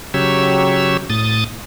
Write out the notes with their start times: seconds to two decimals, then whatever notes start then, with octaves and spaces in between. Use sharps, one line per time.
0.14 C#3 F#3 G4 C#5 E6
1.10 A2 D#6 A6